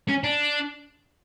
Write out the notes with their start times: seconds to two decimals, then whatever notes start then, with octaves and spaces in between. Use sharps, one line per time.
0.09 C#4
0.24 D4